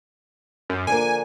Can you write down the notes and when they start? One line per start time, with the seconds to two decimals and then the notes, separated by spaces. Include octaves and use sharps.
0.70 F#2
0.87 D3 F3 A#3 G#5